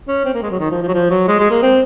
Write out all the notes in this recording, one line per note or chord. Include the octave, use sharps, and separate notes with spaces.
C#4
C4
A#3
G#3
F#3
D#3
F3
F3
F#3
F3
F#3
G#3
G#3
A#3
C4